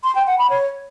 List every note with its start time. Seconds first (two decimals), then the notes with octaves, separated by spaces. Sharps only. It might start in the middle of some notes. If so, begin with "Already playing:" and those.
0.04 C6
0.15 G5
0.27 F#5
0.38 B5
0.50 C#5